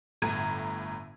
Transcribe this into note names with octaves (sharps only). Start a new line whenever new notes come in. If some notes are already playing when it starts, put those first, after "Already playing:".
G1 A2 A#5 G#6 D#7